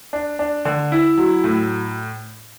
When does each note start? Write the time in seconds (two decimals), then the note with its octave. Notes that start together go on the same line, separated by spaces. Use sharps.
0.13 D4
0.39 D4
0.65 D3
0.92 E4
1.18 F#3
1.44 A2